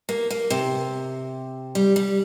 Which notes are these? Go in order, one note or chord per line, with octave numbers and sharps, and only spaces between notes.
A#3
A#3
C3
G3
G3